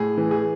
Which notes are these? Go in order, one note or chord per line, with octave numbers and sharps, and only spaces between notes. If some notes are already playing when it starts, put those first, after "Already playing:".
Already playing: A2 G#4
E3
G#4